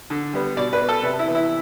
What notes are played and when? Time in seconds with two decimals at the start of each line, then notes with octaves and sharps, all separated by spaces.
0.10 D3
0.33 G3 B3
0.57 B2 D5
0.73 B4
0.81 B3
0.88 A4
1.03 C3 B4
1.19 E4
1.27 E3 B3
1.35 E4